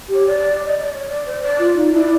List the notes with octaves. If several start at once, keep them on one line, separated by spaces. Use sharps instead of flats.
G4
C#5
D5
D#5
D5
C#5
D5
C5
D5
F4
D#4
E4 D5